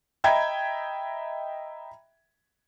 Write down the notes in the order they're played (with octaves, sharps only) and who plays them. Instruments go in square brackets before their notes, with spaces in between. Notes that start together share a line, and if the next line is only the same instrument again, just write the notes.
[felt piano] D#5 E5 G5 A#5 B5 G#6